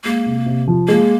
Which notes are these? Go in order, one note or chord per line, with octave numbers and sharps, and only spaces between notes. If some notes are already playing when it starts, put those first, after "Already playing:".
G#3 A#3
C3
C3
F3
G#3 A#3